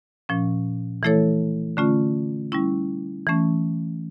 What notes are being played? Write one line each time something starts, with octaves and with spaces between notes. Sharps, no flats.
A#2 F3 C#4
E3 A3 E4 A4 C#5
D3 A3 C#4 F4
G3 C#4 E4
E3 A3 C#4